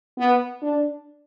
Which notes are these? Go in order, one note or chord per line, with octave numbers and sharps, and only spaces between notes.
B3
D4